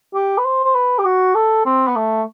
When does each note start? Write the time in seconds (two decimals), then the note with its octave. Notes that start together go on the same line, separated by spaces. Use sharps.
0.14 G4
0.38 B4
0.45 C5
0.64 C5
0.75 B4
0.99 G4
1.05 F#4
1.35 A4
1.66 C4
1.88 B3
1.96 A3